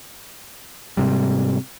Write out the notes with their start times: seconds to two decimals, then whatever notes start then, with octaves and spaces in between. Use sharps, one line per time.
0.97 G#2 C3 G3